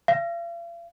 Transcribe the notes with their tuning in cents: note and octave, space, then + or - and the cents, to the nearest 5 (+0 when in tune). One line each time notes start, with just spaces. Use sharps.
F5 -40